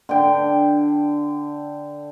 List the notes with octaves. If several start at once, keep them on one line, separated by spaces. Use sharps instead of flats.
D3 G5